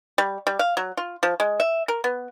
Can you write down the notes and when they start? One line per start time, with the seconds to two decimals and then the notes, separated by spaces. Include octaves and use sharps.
0.18 G3
0.47 G3
0.59 F5
0.77 F#3
0.97 F4
1.23 F3
1.40 G#3
1.60 E5
1.88 A#4
2.04 B3